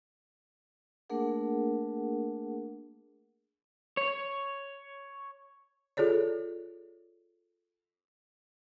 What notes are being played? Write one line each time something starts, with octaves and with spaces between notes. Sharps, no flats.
A3 A#3 D4 G#4 A#4 F#5
C#5
F4 G#4 A4 C#5 D5